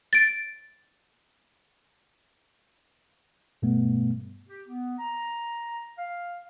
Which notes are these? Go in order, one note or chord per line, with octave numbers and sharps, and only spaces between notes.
A6 D7
G2 B2 G3 A3 B3
G4
B3
A#5
F5